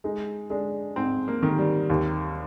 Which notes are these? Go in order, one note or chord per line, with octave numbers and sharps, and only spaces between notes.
G#3 D#4
G#3 D4
G#2 C4
A#3
D#3
G3
D#2